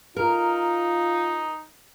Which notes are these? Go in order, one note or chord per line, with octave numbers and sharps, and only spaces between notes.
D#4 F4 A#4